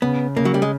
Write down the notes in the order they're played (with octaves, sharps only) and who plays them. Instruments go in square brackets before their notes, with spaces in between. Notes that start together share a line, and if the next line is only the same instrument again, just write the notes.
[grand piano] C#3 [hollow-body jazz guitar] B3
[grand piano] C#3 [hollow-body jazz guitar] A#3
[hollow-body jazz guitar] F#3
G3
G#3